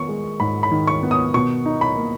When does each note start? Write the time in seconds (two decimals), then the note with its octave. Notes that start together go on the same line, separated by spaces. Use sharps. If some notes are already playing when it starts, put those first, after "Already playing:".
Already playing: D#3 B3 C#6
0.09 G#3
0.40 G#2 B5
0.63 B5
0.71 D#3
0.87 C#6
1.03 B3
1.11 D#6
1.34 B2 C#6
1.66 D#4
1.81 B5
1.96 A#3